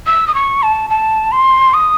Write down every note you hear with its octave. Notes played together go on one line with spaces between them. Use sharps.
E6
D#6
C#6
A5
A5
C6
D#6